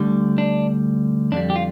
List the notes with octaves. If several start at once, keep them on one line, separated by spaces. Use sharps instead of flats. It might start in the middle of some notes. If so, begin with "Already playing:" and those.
Already playing: D2 D3 G3
D4
F2 D3 G3 D4
G4
F4